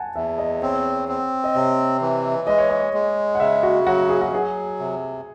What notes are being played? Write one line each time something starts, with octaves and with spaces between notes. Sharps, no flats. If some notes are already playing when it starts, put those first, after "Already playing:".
Already playing: F#5 G#5 A5
E2 E5
D#5
C4 C#5
C4
D#5
C3 C#5
E3
G#3 D#5
C#5
D#5
G#3
F#5
C#3 E5
F#4
F#3 F#4
G#4
F#4
F#3 G#4
C3